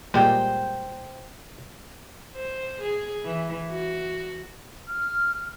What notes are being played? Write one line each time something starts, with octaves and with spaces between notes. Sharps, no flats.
A#2 G3 G#3 C5 G5
C5
G#4
E3
F#4
F6